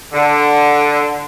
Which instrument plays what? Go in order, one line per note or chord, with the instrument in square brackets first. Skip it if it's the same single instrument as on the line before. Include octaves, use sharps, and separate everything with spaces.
[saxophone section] D3